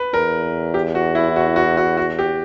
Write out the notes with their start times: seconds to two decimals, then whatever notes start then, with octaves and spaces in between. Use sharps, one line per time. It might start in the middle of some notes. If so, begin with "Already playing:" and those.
Already playing: B4
0.13 E2 A#4
0.74 G4
0.95 F#4
1.15 E4
1.36 F#4
1.56 F#4
1.77 F#4
1.97 F#4
2.19 G4